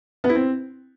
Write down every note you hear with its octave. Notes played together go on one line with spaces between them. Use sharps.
B3
E4
C4